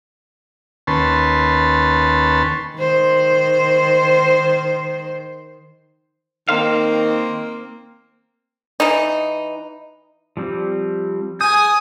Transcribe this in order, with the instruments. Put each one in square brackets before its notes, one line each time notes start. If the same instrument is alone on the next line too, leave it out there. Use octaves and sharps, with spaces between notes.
[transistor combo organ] D#2 C#4 B4 A5 C6
[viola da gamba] D#3 C5
[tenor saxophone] D#3 [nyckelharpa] A#3 C4 [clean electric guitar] C5 F5
[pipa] E3 D#4
[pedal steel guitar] F3 G3 C4
[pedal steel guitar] G#4 G6 [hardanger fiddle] G#5 [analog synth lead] D#6